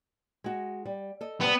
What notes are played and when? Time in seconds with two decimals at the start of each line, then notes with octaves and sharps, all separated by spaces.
0.44 G#3 F#4
0.86 G3
1.21 A4 D#5
1.40 C3 G3 B3